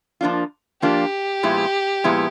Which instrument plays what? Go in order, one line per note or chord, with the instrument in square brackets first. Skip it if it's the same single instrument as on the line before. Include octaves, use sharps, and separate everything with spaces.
[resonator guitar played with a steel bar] F3 A#3 D4 F4
[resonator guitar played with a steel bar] F3 A#3 D4 F4 [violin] G4
[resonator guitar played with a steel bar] A#2 F3 G#3 B3 E4
A#2 F3 G#3 B3 E4